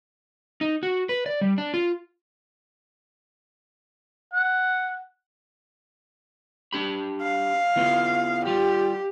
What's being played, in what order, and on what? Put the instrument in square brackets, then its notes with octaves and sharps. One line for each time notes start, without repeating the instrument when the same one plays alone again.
[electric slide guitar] D#4
F#4
B4
D5
G3
D4
F4
[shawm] F#5
[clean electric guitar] D4 G4 B5
[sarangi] F5
[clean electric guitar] E3 B3 F4
[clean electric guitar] G3 F4 [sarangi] G4